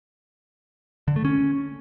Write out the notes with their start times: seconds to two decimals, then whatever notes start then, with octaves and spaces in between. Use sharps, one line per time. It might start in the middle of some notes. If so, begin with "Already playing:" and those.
1.08 D3
1.16 A3
1.25 C#4